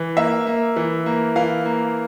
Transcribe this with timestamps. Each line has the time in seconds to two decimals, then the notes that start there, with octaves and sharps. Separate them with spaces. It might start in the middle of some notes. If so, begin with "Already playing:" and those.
Already playing: E3
0.17 A#3 E5
0.47 A#3
0.76 E3
1.06 A#3
1.36 E3 F5
1.66 A#3